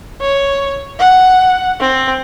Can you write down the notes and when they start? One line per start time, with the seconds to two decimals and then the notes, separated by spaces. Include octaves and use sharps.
0.21 C#5
0.99 F#5
1.80 C4